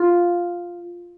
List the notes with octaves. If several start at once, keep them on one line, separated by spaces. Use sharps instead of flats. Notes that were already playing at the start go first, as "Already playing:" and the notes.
Already playing: F4